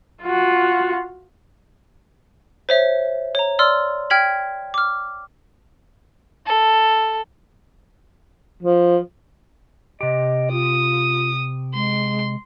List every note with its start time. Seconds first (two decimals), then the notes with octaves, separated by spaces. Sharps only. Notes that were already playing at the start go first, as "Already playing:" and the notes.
0.23 F4 F#4
2.69 C5 C#5 E5
3.35 C#5 A#5
3.59 D5 C6 E6 F6
4.10 G5 F6 G#6 B6 F#7
4.74 D6 F6
6.47 A4
8.62 F3
10.01 C3 G4 D#5
10.52 F4 D#6
11.74 G#3 C6